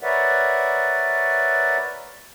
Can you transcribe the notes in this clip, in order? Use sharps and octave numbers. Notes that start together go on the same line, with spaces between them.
A#4 B4 C#5 D5 E5 F#5